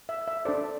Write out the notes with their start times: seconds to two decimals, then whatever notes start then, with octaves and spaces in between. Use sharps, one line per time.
0.09 E5
0.28 E5
0.45 D4 A4 C5 D5